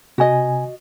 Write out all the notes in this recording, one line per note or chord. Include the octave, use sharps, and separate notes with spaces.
C3 F#4 D#5 G#5